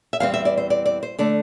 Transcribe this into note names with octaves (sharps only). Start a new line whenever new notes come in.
E5
E2 E3 G3 C4 F5
E5
D5
C5
D5
D5
C5
D3 A3 D5